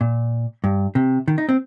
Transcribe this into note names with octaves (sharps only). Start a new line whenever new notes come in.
A#2
G2
C3
D#3
D#4
C4